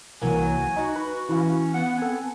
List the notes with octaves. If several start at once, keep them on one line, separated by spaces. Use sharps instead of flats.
C2 E3 F#3 A#3 G#5
D#4 F#4
B4
E3 C#4 B4 F5
B3 F#5
C4 A4 G#5